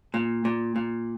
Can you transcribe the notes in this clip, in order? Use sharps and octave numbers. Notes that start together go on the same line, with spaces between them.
A#2
A#2
A#2